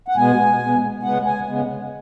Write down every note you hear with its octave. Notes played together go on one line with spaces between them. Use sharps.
F#5
B2 G#3 B3 G#5
B2 G#3 B3
C#3 G#3 B3 F#5
G#5
C#3 G#3 B3